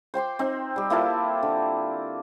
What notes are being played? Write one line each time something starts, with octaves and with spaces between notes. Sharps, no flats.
C5 G5 C6 D6
C4 D#4
G3 G4
A#3 E4 F4 A4
D3